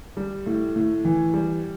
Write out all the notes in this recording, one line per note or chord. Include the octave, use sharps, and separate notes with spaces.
G3
A2
A2
E3
G3